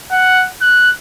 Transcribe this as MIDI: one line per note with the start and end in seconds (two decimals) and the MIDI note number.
0.12 0.45 78
0.62 0.90 90